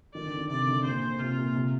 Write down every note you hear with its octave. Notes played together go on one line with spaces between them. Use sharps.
D#3 D5
D3
D#3
C3 D5
D3
A#2 C5
C3 F4
A#2
C3